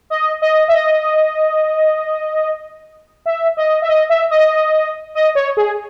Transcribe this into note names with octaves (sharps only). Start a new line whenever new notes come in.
D#5
D#5
E5
D#5
E5
D#5
E5
D#5
E5
D#5
D#5
C#5
G#4